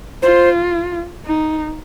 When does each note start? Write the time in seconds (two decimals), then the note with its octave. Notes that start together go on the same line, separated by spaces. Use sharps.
0.22 F4 C5
1.26 D#4